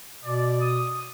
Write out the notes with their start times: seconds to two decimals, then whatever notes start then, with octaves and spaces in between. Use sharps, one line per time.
0.24 B2 D5
0.60 D#6